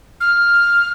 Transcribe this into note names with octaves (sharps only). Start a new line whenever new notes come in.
F6